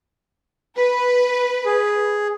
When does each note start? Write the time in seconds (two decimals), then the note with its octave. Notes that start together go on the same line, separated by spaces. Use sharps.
0.77 B4
1.66 G#4